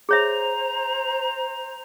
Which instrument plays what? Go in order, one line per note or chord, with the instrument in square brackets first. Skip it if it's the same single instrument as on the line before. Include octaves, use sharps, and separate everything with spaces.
[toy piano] G#4 C#5 E5 [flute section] C5 A#5